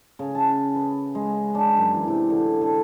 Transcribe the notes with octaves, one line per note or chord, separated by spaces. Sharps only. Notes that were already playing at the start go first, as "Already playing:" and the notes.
C#3
A5
B4
G#3
D4
F#2
E3
C3
D3
D3